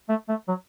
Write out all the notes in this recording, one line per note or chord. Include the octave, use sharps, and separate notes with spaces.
A3
A3
F#3